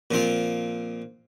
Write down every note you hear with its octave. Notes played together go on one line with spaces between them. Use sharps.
A#2 F3 C4 F4